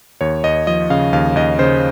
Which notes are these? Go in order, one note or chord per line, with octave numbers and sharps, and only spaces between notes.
D#2 C#5
D#2 D#5
F3 D#5
C#3 F5
D#2 F5
D#2 D#5
C#3 C5